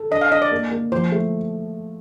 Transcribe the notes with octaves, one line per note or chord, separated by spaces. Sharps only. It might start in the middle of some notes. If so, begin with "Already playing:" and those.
Already playing: A4
D4 D#5
F5
D4 D#5
D5
A#3
A#3
F3 C5
A3